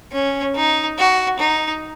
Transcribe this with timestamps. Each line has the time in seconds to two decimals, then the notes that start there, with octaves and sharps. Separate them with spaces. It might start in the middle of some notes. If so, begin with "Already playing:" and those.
0.12 C#4
0.55 D#4
0.98 F#4
1.40 D#4